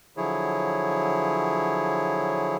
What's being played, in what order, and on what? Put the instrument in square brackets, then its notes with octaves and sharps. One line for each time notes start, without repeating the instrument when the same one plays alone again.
[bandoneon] D3 F3 F#3 E4 G#4 C#5